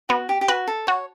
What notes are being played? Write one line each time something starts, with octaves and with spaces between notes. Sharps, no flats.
B3 F#4
G4
G4
F#4 B4
A4
F#4 C#5